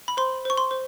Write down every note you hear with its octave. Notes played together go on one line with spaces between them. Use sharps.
B5
C5 C6
C5 C#6
C6
C5